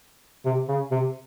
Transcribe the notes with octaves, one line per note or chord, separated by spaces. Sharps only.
C3
C#3
C3